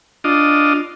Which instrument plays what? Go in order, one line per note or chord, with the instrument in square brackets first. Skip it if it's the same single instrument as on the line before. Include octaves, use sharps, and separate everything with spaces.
[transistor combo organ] D4 F4 D#5